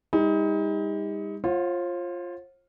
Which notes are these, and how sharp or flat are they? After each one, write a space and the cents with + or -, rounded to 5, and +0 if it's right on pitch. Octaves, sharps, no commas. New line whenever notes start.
G3 +40 D#4 +30
F4 +0 C5 +45 F#5 -25